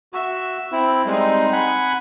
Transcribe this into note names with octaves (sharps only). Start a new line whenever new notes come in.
F#4 E5
C4 E4
G3 G#3 C4 D#4
F#5 G#5 B5